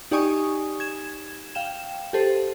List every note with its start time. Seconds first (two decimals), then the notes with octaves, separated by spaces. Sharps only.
0.11 D#4 G4 D5 G#5 C#6 D#6
0.80 G#6 E7
1.55 F5 G5 E7
2.13 G4 A4 C5